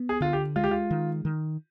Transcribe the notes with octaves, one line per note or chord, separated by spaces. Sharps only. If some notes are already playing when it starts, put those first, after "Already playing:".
Already playing: B3
G#4
D3 F4
G4
G#3 F4
G4
F4
D#3
D#3